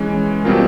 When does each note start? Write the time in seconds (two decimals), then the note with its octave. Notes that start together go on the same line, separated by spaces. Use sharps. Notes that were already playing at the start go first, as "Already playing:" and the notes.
Already playing: E3 G#3 C#4
0.45 B2 G3 C4 F4 A#4